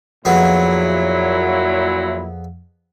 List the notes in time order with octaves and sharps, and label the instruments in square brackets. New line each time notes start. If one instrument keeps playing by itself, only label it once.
[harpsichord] F2 B3 G#4 [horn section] A#2 F#3 E4